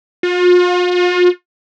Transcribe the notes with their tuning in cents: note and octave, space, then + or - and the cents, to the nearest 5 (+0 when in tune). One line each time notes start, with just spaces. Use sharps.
F4 +40